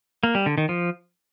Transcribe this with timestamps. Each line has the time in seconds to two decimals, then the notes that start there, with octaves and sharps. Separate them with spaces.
0.23 A#3
0.35 G3
0.46 D3
0.58 D#3
0.69 F3